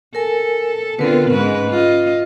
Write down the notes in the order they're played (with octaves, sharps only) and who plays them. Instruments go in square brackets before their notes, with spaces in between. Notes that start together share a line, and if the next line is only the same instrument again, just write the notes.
[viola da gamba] A4 [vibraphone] A#4 G#5
[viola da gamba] D3 C4 F4 [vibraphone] B3 A#4 B4
[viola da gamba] G#2 G#3 B4 [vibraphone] C#4
[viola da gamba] F4 D#5